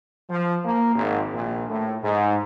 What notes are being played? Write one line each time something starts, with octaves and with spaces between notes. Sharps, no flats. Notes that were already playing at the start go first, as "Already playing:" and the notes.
F3
A#3
G#1
A#1
A2
G#2